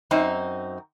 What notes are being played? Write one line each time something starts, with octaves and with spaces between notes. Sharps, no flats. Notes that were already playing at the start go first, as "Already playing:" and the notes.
F#2 C4 D#4